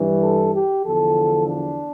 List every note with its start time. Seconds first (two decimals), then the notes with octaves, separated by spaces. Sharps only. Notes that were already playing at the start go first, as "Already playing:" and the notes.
Already playing: G2 E3
0.22 A4
0.53 G4
0.84 E2 D3 F3 A4
1.47 D4